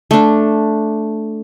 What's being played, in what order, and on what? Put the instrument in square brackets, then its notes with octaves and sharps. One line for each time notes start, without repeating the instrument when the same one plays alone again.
[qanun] A3 D4